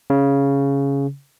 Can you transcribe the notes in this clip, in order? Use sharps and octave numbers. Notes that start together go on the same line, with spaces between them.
C#3